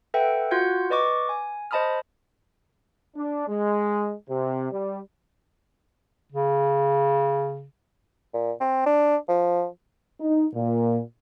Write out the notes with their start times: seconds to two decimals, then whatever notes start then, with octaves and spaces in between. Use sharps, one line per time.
0.14 A4 B4 E5 F#5 G5
0.51 F4 F#4 F#5 G6 G#6 C#7
0.90 B4 D5 D#5 C#6 D6
1.29 G#5
1.71 C5 D#5 A5 B5 D#6 F6
3.15 D4
3.48 G#3
4.29 C3
4.72 G3
6.32 C#3
8.34 A#2
8.61 C4
8.86 D4
9.29 F3
10.19 D#4
10.53 A#2